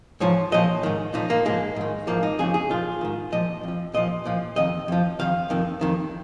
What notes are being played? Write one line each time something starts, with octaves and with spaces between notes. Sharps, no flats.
G#2 F3 C#5
A#2 F3 D#5
G#2 D#3
A#2 F3 D#4
A#3
G#2 F3 G#3
G#2 D#3
G#2 F3 A#3
D#4
F2 C#3 F3 G#4
G#4
A#2 F3 F4
G#2 D#3
A#2 F3 D#5
F2 F3
A#2 F3 D#5
A#2 F3
F2 D#3 D#5
F2 F3
F2 D#3 F5
F2 D#3
F2 D#3